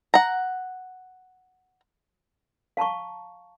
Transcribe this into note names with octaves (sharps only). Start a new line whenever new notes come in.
F#5 A#5
F5 A5 A#5 C#6